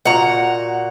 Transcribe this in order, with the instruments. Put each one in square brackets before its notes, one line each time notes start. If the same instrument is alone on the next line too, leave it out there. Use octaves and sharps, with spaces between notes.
[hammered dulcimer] A#2 F#4 [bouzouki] F#5 A#5